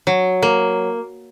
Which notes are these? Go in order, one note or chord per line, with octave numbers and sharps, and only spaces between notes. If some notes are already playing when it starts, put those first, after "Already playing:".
F#3
A#3